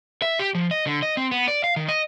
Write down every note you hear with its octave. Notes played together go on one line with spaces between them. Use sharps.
E5
G4
F3
D#5
D3
D#5
C4
B3
D5
F5
D#3
D#5